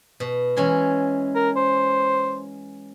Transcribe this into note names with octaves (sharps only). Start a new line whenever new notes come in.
B2
E3 G#3 C#4
A#4
C5